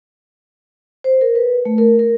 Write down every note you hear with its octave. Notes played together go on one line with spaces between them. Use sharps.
C5
A#4
B4
A3
A#4
A#4